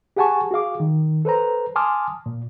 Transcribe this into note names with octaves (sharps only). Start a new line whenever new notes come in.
G4 G#4 F#5 G#5 A5 C#6
F#4 G#4 F5 D6
D#3
A4 B4 C5 A#5
G#5 A5 C6 D6 D#6 F6
A#2